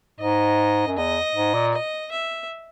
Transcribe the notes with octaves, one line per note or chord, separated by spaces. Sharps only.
G#2 D#5
F#2
E2 D#5
G#2
A#2
D#5
E5